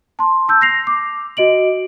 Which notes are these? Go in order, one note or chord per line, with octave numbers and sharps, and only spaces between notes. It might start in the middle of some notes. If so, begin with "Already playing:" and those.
A5 C6
A5 E6 G6
A#6 C7 F7
D6
F#4 D#5 D7 F#7